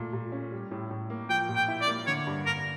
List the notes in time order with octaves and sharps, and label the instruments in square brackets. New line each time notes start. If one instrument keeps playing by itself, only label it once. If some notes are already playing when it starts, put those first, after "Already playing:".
Already playing: [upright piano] A#2 A3
A#2
C#4
G3
A2
A2
A#3
[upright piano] F3 [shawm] G5
[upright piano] A#2
[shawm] G5
[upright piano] E4
[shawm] D5
[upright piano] A#3
[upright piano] D3 [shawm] C#5
[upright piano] G2
[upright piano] G2 [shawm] A#4